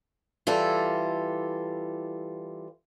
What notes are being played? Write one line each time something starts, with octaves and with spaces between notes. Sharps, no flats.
E3 G3 F4 A4